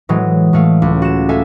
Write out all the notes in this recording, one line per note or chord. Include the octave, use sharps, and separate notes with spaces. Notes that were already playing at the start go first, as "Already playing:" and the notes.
A2 E3 F#3 G#3
A2 A3 F5
C#2
F#4 E7
A4 E5 F5 G#5